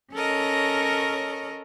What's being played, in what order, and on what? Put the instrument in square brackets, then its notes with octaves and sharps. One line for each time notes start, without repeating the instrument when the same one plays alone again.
[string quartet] C#4 A4 A#4 C#5 D#5